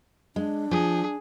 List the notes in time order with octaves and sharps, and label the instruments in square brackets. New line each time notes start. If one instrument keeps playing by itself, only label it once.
[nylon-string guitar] G#3 [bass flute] D4
[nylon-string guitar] F3 [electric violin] G#4